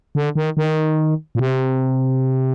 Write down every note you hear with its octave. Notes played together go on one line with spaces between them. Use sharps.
D3
D#3
D#3
A#2
C3